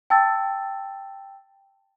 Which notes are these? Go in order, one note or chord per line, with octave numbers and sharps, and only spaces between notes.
G5 A5 E6 A6